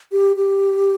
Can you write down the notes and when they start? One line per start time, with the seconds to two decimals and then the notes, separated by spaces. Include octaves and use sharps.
0.12 G4
0.36 G4